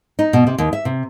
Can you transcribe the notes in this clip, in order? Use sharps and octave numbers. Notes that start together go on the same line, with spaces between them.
D#4
B2
C3
D#2
E5
C3